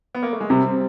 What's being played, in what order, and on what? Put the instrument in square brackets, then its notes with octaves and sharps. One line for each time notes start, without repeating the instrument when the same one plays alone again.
[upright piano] B3
A#3
A3
G#3
[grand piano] C3 [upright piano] G3
[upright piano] C4